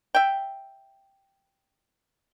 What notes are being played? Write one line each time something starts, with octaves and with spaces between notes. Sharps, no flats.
E5 G5